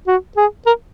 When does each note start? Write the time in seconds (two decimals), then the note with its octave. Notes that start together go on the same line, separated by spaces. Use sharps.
0.07 F#4
0.37 G#4
0.66 A#4